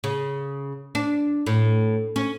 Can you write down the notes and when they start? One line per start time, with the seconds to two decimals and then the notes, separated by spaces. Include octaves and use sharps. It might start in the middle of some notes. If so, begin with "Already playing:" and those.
0.04 C#3
0.95 D4
1.46 A2
2.16 C#4